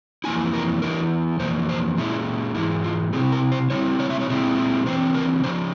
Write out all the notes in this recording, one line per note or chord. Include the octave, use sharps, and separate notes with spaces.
F2 E3 A#3 E4 G#5
A#4
E2 E3 A#4
F2 E3 A#3 C5
C5
A#2 G#3 C#4 E4
G#2 E3 G#3 E4
F4
C3 F3 C4 E4 G#4
A#4
C5
C#3 G3 C4 E4 C#5
C#5
E5
C#5
A#2 G#3 C4 E4
C#3 E3 C4 C5
A#4
C#3 F3 C#4 C5